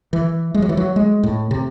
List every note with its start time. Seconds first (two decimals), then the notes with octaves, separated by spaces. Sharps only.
0.13 E3
0.54 G#3
0.62 F#3
0.69 E3
0.77 F#3
0.96 G#3
1.23 A2
1.51 C3